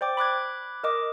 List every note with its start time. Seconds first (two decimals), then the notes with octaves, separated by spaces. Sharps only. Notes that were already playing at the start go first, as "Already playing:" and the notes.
0.01 C5 D5 G5 D6
0.17 B5 D6 F#6 G#6
0.83 A#4 D#5 D6